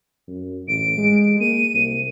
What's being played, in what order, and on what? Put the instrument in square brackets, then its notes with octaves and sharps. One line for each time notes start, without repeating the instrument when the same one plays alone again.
[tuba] F#2
[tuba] A1 [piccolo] D7
[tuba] G#3
[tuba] A#3 [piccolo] D#7
[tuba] C2